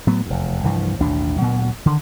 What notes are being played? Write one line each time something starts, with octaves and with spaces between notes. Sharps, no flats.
A2 F#3 B3
F1 E2
C2 G2 E3 F3
A1 D#2 B2 D4
D2 A#2 F#3 B3
D3 D#3